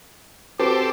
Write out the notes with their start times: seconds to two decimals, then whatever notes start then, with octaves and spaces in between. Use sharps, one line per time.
0.59 C4 F#4 G4 A4 B4 C5 D6